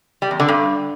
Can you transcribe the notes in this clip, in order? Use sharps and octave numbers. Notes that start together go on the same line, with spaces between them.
G3
E2
D3
G2